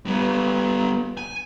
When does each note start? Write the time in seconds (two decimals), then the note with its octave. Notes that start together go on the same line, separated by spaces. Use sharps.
0.06 G3 B3
1.17 G#5